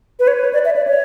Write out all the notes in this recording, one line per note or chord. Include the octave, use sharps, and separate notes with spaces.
B4
C#5
B4
C#5
D5
E5
D5
C#5